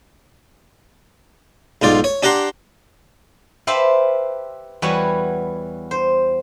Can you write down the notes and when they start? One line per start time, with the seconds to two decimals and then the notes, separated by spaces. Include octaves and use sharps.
1.82 B1 G#2 F4 D5
2.04 C#5
2.23 D4 G4 F#5 A#5 C6
3.67 G4 B4 C5 E5 F5 A5
4.82 E2 G3 F#4 B4 C#5 G#5
5.91 C5